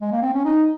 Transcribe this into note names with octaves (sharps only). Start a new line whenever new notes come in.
G#3
A#3
C4
C#4
D#4